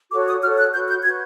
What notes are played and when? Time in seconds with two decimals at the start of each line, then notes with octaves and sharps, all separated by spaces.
0.11 F#4 A4 C#5 D6
0.27 D#6
0.42 F#4 A4 C#5 F6
0.57 F#6
0.73 F#4 B4 G6
0.89 G6
1.04 F#4 B4 G#6